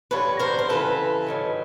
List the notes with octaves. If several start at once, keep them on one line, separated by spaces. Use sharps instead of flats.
G2 D3 F3 B4 C#5
A#4 C5
C5
F2 C#3 E3 A4 B4
G#2 D#3 F#3